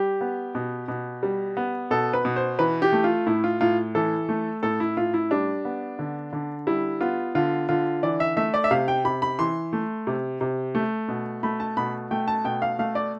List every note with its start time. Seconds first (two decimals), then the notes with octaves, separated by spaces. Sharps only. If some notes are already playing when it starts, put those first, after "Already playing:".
Already playing: G3 G4
0.21 B3
0.55 B2
0.88 B2
1.23 G3
1.57 B3
1.91 B2 A4
2.13 B4
2.25 B2
2.36 C5
2.59 E3 B4
2.82 G4
2.92 A3
3.04 F4
3.27 A2 E4
3.44 F4
3.61 A2 F4
3.95 E3 A4
4.29 A3
4.63 A2 A4
4.80 E4
4.97 A2 F4
5.14 E4
5.31 G3 D4
5.65 B3
5.99 D3
6.33 D3
6.67 G3 E4
7.01 B3 F4
7.35 D3 F4
7.69 D3 F4
8.03 E3 D5
8.20 E5
8.37 A3 E5
8.54 D5
8.64 E5
8.71 C3 F5
8.88 G5
9.05 C3 B5
9.22 B5
9.39 E3 C6
9.73 A3
10.07 C3
10.41 C3
10.75 A3
11.09 B2
11.43 A3 B5
11.60 A5
11.77 B2 B5
12.11 A3 G5
12.28 A5
12.45 B2 G5
12.62 F5
12.79 A3 F5
12.95 D5